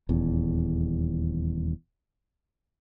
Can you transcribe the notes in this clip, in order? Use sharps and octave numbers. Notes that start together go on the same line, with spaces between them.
D#1 E2